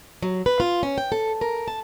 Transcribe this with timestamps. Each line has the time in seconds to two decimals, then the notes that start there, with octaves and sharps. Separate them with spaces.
0.22 F#3
0.46 B4
0.60 F4
0.83 C#4
0.98 G5
1.12 A4
1.41 A#4
1.68 A5